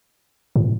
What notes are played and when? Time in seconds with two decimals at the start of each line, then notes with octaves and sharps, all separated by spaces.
0.56 A2